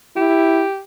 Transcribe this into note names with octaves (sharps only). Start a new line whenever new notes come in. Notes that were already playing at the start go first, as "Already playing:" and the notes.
E4 G4